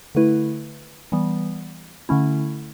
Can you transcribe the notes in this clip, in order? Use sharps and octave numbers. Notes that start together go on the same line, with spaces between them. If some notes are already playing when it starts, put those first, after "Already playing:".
D3 A3 E4 B4
E3 G3 B3
D3 A3 C#4 E4